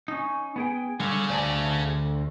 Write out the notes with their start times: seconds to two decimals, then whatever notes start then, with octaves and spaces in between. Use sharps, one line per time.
0.08 C#4 D#4
0.56 B3 G#4 G5
1.00 D3 F#3 G3 G#4 F5
1.30 D2 C5 D5 G#5 A5